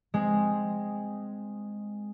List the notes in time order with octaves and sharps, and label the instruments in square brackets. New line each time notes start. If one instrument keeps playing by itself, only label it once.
[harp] G#3 C4